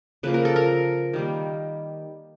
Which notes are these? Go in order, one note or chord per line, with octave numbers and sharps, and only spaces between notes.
C#3 F3 A#3 B4
A#4
A4
A#4
D#3 G3 A#3